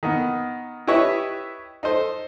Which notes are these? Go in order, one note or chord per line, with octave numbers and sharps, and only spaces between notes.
D#3 B3
E4 G4 B4 C#5 D#5 E5
D#4 A4 C5